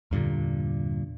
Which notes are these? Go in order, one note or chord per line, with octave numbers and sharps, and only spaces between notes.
E2 G2 A#2 D3